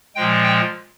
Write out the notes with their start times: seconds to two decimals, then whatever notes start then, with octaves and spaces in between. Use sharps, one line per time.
0.16 A#2 F3 G#3 G5
0.44 G5